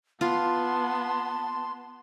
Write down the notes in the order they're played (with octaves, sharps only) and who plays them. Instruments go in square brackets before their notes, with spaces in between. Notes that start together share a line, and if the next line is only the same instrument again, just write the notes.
[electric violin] B3 [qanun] F4 [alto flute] A5 [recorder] C6